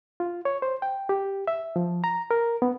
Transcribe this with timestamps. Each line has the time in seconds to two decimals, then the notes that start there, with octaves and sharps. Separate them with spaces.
0.20 F4
0.45 C#5
0.62 C5
0.82 G5
1.09 G4
1.47 E5
1.76 F3
2.04 A#5
2.31 A#4
2.62 B3